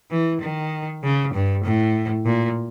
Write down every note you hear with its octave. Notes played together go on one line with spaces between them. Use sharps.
E3
D#3
C#3
G2
A2
A#2